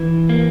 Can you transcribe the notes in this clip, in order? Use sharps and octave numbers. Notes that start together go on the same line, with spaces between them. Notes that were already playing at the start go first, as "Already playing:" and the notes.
Already playing: E3
A#3